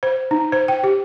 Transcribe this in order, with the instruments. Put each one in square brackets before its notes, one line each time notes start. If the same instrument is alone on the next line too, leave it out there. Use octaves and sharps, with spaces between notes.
[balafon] C5
D#4
C5
G5
G4